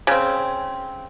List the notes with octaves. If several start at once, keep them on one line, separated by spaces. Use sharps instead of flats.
C#3 C4